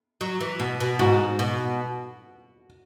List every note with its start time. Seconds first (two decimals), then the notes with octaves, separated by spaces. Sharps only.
0.21 F#3
0.40 E3
0.60 B2
0.80 B2
0.99 G#2 F#4
1.39 B2